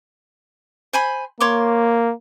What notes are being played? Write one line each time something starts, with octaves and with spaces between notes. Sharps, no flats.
C5 G#5 B5
A#3 C#5 C6 D6